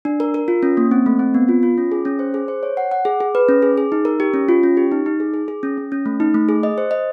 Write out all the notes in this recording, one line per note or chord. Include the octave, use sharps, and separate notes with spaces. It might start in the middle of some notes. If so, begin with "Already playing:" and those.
D4
A#4
A#4
F4
C#4
A#3
C4
A3
C4
B3
F4
F4
C#4
G#4
C#4
C5
G#4
C5
C#5
F#5
F#5
G#4
G#4
B4
C#4
G#4
G#4
D#4
A#4
G4
C#4
F4
C#4
G4
D#4
D#4
G#4
G#4
G#4
C#4
C#4
C#4
A3
D#4
A3
G#4
D#5
C5
D#5